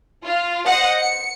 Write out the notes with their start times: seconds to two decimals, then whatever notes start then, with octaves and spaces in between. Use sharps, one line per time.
0.25 F4
0.66 C5 D#5 F#5
0.98 C#7